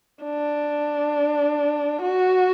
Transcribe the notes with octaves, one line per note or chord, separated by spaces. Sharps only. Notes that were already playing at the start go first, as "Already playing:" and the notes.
D4
F#4